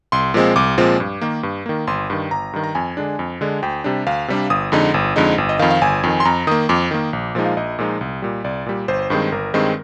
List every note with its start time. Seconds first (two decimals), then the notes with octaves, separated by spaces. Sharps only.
0.12 C2 C6
0.34 A#2 F3 G#3 C4
0.56 C2 D6
0.78 A#2 F3 G#3 C4
1.00 G2
1.21 D#3 A#3
1.43 G2
1.66 D#3 A#3
1.87 G1 C6
2.10 G2 D#3
2.31 G1 A#5
2.53 G2 D#3
2.64 A#5
2.75 F2 G#5
2.97 D3 G#3 D4
3.19 F2
3.41 D3 G#3 D4
3.63 D2 G5
3.84 C3 G3 D4
4.06 D2 F5
4.28 C3 G3 D4
4.50 G1 D#6
4.72 F2 D3 G#3 D#4
4.94 G1
5.16 F2 D3 G#3 D#4
5.38 G1
5.49 D#5
5.59 D#3 F5
5.62 F2
5.71 F5
5.81 G1 G#5
6.03 F2 D#3
6.20 C6
6.25 F2 A#5
6.47 D#3 A#3 D#6
6.69 F2 D6
6.91 D#3 A#3
7.13 A#1
7.35 A#2 F3 G#3 D#4
7.46 F5
7.57 A#1 D#5
7.79 A#2 F3 G#3 D#4
8.01 C2
8.22 A#2 G3
8.44 C2 D5
8.66 A#2 G3
8.88 G1 C5
9.10 G2 D#3 G#3 C4
9.32 G1 A#4
9.54 G2 D#3 G#3 C4